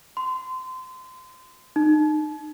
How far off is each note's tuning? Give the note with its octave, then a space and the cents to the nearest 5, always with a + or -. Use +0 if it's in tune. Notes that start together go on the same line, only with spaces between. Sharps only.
C6 -25
D#4 -30